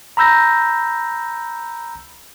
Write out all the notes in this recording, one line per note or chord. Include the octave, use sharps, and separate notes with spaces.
A#5 B5 E6 G6 A#6